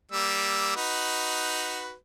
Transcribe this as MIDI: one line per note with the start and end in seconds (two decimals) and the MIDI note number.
0.12 0.72 55
0.12 0.72 58
0.12 0.72 88
0.76 1.94 63
0.76 1.94 66
0.76 1.94 71